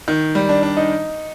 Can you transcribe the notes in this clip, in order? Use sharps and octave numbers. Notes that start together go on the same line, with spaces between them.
D#3
G3
D4
D4
D#4